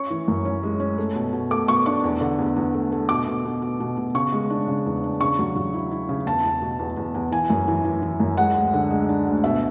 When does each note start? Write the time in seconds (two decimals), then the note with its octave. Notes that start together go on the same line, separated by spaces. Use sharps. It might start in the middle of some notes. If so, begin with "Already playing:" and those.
Already playing: C#4 C#6
0.10 E3
0.28 F#2
0.45 C#4
0.63 G#3
0.80 C#4
0.98 A3
1.15 B2
1.33 B2
1.51 A3 D6
1.68 B2 C#6
1.86 D4 C#6
2.04 E2
2.21 D3
2.39 E2
2.56 E2
2.74 A3
2.92 A3
3.09 B2 D6
3.27 B2
3.45 B2
3.62 B2
3.80 B2
3.98 B2
4.15 C#3 C#6
4.32 G#3
4.50 D4
4.68 C#3
4.86 E2
5.04 D4
5.21 C#3 C#6
5.39 F#3
5.56 F#3
5.74 E4
5.91 E4
6.09 C#3
6.26 E2 A5
6.44 E2
6.62 B2
6.79 E2
6.97 E2
7.15 E2
7.32 E3 G#5
7.50 F#2
7.68 E3
7.85 E3
8.02 E3
8.20 F#2
8.37 G#3 F#5
8.56 D2
8.74 D3
8.91 G#3
9.09 D4
9.27 D2
9.44 B2 E5